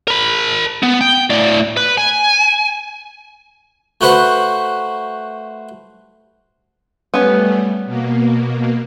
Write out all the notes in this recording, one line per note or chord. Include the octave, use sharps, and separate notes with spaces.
A#4 B5
B3
G5
A2 D5
B4
G#5
A3 F#4 B4 C5 F#5
G3 A3 B3 C#4
B2 A#3